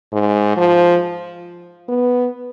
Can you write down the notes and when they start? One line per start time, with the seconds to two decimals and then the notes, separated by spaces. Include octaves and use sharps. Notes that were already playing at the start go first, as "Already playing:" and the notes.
0.13 G#2
0.57 F3
1.88 B3